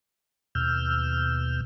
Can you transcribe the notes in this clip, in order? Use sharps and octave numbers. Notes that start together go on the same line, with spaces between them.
D#2 B2 E6 F6 G6